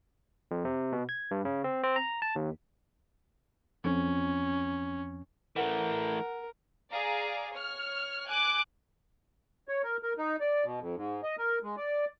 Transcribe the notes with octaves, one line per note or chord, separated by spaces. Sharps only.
F2
C3
B2
G#6
G2
C#3
C4
C4
A#5
A5
D#2
F2 C#4
E3 A3 A#4 F#5
G#4 D5 F5 A#5
C#5 F6
G#5 D6 F#6
C#5
A#4
A#4
D#4
D5
B2
F2
G#2
D#5
A#4
G#3
D5